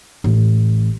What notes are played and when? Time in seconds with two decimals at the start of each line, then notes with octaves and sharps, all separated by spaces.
0.24 A1